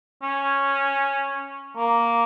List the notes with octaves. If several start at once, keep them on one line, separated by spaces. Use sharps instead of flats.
C#4
A#3